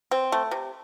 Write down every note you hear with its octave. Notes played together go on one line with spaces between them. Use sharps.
C4
A3
C3